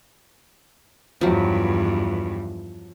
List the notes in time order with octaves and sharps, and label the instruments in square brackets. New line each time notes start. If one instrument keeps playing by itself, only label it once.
[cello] E2 G2 [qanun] F3 F#3